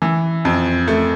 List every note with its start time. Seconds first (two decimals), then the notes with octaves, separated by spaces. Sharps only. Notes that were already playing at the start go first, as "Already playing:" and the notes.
0.02 E3
0.45 F2
0.88 A3